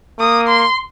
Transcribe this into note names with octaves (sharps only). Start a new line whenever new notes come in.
A#3 D#6
C6